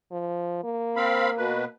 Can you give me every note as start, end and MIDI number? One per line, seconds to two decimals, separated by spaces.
0.11 0.59 53
0.63 1.71 58
0.96 1.30 60
0.96 1.30 77
0.96 1.30 83
1.37 1.65 47
1.37 1.65 71